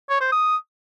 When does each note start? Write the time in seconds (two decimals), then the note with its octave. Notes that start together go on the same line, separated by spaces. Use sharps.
0.10 C#5
0.21 C5
0.32 D#6